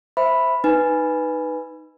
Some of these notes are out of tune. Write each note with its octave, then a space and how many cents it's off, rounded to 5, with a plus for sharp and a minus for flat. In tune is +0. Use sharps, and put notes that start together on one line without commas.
C5 +0 E5 -5 B5 +0
D#4 -5 B4 +0 G#5 +0